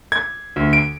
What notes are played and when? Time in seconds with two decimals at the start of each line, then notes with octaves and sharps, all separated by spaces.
0.12 G#6
0.56 D2
0.73 D7